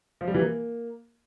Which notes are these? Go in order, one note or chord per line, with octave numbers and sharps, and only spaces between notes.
F3
G3
E3
A#3